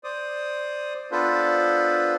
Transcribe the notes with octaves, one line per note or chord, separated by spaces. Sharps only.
C5 D5 D#6
B3 D4 F4 A4 B4 C5